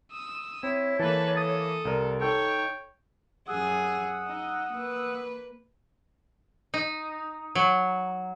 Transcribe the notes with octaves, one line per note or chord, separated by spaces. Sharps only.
D#6 E6
C4 E4 C#5
E3 A#3 A4 B4 A5
A4 D#6
C2 A#4 D5
D#4 A4 C#5 G5
F#2 G#4 F#5 D#6 E6
D#4
A#3 B4
D#4
F#3